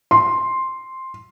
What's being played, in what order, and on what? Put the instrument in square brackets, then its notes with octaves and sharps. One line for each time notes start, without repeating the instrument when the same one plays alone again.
[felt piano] C6